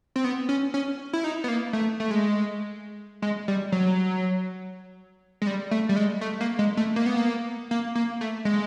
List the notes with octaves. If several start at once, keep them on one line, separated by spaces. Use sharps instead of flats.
C4
B3
C#4
C#4
E4
D#4
B3
A#3
A3
A3
G#3
G#3
G3
F#3
G#3
G3
A3
G3
G#3
A3
A#3
G#3
A3
A#3
B3
A#3
A#3
A#3
A3
G#3